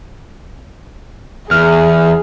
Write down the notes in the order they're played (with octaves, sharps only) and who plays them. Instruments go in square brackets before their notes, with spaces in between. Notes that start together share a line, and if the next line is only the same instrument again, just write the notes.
[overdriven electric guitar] E2 [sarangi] G#4 [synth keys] F6